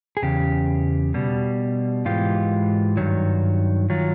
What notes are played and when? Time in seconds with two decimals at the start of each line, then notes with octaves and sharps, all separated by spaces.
0.17 G#4
0.22 E2 C#3 G4
1.14 B2 G3
2.05 G#2 E3 G#3 F4 G4
2.97 G2 D#3 F#3
3.90 D#3 F#3 F4